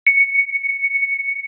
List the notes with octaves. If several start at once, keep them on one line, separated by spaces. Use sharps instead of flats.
C#7